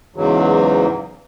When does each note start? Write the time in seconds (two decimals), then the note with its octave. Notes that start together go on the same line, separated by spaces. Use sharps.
0.16 E2 G#2 C#3 E3 F#3